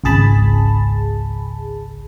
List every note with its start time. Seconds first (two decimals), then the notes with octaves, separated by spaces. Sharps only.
0.04 G#1 C#2 G#4 A5 B5